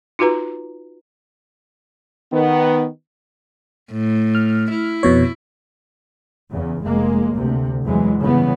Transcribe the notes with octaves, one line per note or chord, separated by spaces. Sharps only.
D#4 F4 F#4 B4 A#5
D#3 B3
A2
F6
E4
F2 B2 C#5
E2 C#3
F1 G#3 A#3
D2 C3
E2 G#2 E3 F#3 G#3
G2 C#3 E3 B3